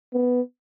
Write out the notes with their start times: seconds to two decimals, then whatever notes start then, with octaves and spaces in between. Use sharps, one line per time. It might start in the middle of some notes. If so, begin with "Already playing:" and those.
0.14 B3